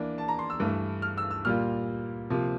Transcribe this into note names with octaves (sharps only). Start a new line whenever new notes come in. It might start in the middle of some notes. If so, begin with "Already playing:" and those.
Already playing: E3 A#3 D4
A5
A#5
C6
E6
G2 E3 A3
F6
E6
E6
A#2 G3 A#3 F4 F6
C3 F3 A#3